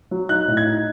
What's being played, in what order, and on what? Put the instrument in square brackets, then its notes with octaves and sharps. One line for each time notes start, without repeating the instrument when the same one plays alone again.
[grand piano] F#3
D#4 F#6
A2
G#6
D#4